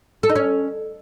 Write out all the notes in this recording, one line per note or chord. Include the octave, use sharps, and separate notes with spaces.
A4
D#4
C#4